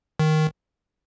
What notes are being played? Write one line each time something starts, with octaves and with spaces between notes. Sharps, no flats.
D#3